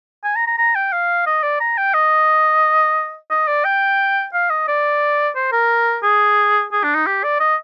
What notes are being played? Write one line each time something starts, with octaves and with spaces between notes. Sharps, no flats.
G#5
A#5
A#5
A#5
G5
F5
D#5
D5
A#5
G5
D#5
D#5
D5
G5
F5
D#5
D5
C5
A#4
G#4
G#4
D4
D#4
G4
D5
D#5